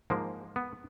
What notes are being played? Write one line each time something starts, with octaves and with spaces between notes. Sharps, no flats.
G#2 F3 G#3 A#3
B3